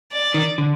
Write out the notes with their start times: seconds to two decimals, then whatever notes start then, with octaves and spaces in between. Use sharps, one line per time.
0.12 D5
0.34 D#3
0.58 D3